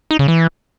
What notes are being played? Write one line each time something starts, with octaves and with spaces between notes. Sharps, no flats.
D#4
C#3
E3